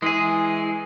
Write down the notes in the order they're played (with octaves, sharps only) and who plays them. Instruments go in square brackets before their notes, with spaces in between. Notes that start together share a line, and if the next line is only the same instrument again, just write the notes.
[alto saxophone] E3 [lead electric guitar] G#3 G#4